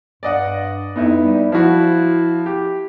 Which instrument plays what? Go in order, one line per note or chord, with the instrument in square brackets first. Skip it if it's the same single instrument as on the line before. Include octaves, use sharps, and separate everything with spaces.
[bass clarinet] G2 [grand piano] D5 D#5 F#5
[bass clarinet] F2 [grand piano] B3 D#4 E4
[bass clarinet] G3
[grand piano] F3 F#4 [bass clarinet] E4
[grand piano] G4